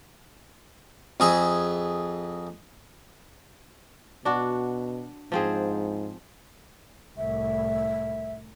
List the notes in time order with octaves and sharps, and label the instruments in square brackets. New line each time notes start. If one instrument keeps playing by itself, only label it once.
[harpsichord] F2 G#4 E5
[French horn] B2 [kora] D4 F#4
[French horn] G#2 [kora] F3 C4 G#4
[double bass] C2 A2 [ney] E5